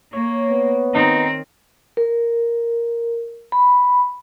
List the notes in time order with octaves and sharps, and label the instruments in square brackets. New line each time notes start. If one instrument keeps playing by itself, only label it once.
[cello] A#3 [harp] C#5
[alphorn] B3
[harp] D#3 [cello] C4 [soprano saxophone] D#4
[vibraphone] A#4
B5